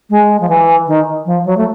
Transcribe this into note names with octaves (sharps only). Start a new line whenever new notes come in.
G#3
F3
E3
D#3
F3
F#3
A3